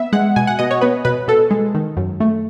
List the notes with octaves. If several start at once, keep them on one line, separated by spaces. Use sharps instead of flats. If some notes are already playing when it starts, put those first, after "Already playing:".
Already playing: B3 E5
G#3 F#5
B2 G#5
F#5
B2 D#5
C#5
B3 B4
B2 B4
B2 A4
G#3
D#3
F#2
A3